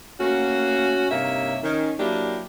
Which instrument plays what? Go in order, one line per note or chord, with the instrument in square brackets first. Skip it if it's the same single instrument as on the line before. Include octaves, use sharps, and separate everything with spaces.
[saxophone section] A3 A#3 C#4 F#4
G2 C3 A#3 D#4 C#5 E5
D#3 C#4
F#3 A#3 D4 E4 G4